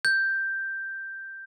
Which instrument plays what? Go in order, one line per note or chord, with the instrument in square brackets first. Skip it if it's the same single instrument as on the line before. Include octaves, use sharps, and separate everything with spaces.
[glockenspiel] G6